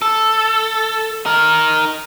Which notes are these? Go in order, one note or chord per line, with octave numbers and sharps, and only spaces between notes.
A4
D#4 A#4